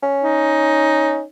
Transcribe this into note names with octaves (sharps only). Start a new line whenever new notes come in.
C#4
D#4